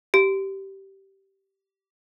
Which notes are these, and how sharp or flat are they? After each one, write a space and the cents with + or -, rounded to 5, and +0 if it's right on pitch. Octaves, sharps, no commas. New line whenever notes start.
G4 -15